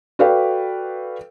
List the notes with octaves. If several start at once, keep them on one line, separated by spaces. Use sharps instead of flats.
F#4 A4 B4 D5 F5 G5